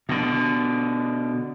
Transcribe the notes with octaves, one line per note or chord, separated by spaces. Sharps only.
B2 D3